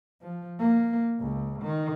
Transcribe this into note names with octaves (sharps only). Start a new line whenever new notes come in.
F3
A#3
C#2
D#3